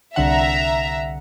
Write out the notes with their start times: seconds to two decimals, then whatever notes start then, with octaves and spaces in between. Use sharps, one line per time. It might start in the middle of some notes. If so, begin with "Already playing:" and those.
0.16 C2 D3 E5 F#5 A#5